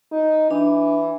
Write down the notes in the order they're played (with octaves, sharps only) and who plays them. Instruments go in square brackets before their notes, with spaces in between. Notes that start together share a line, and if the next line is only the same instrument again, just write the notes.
[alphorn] D#4
[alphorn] E3 [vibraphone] D4